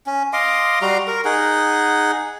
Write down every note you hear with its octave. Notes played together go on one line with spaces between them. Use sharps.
C#4
D#5 F5 C6 D6
G3 F#4 A#5 C6
A#4
D#4 G#4 F#5